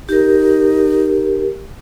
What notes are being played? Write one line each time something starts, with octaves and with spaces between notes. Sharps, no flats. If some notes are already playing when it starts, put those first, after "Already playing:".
D#4 G4 A#4